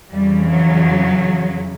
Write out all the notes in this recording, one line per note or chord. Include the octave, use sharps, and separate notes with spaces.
F2 C#3 E3 G3
F#3